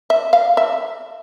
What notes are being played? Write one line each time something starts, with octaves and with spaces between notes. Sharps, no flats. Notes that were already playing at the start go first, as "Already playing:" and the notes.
E5
F5
E5